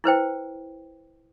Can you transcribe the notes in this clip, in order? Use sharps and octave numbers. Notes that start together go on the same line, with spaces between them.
E4 B4 C5 G5